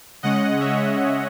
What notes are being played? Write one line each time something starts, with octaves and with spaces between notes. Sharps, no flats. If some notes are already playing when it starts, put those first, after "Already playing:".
C#3 G#3 C#4 D#5 F#5
C#5 E5